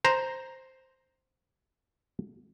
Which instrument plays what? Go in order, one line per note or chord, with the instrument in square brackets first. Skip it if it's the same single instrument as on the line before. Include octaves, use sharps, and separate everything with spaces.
[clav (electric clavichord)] C5 A#5